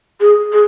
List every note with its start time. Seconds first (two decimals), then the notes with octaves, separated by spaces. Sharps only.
0.21 G#4
0.52 G#4